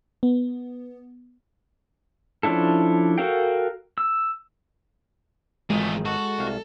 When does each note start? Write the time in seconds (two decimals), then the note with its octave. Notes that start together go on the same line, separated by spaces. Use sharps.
0.23 B3
2.43 F3 C#4 D4 E4 A4
3.18 F#4 A4 A#4 F5 G5
3.98 E6
5.70 G#1 D#3 E3 G#3 A3 F4 G#4
6.05 F#4 A4
6.39 C2 F5